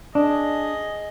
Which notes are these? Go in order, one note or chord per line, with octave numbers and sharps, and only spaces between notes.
D4 G#4 D#5